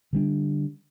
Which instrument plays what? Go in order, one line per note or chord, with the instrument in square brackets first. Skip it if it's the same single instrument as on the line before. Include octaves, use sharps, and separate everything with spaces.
[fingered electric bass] D3 G3 D4